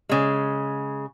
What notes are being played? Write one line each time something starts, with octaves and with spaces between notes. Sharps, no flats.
C#3 G#3